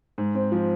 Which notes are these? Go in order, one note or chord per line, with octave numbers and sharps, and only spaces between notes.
G#2
C4
F3